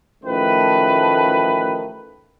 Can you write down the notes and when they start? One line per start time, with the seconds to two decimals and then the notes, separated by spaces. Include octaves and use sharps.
0.24 A1 D#3 F3 A3 B4